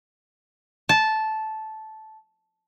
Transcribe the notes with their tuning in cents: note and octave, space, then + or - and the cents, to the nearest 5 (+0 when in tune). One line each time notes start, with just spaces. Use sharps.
A5 -10